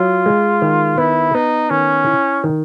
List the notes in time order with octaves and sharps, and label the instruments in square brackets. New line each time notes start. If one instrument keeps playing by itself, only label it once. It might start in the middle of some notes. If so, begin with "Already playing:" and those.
Already playing: [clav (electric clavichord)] F#3 [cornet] F4
[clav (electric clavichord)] G#3
D#3
[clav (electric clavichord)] B3 [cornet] E4
[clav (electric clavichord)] B3 [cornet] D#4
[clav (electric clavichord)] D#3 [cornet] C#4
[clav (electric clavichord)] E4
D#3